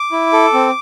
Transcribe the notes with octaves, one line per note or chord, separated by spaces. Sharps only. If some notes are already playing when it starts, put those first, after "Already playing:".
Already playing: D6
E4
A4
C4